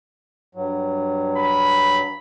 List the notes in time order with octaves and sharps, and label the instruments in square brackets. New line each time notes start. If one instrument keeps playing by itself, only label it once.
[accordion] G2 F#3
[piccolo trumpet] B5